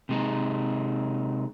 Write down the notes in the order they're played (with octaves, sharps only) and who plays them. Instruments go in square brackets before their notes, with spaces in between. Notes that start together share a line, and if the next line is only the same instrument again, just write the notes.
[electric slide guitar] C3 G#3 D#4